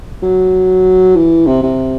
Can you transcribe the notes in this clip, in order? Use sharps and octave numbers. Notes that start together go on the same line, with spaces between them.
F#3
E3
C3
C3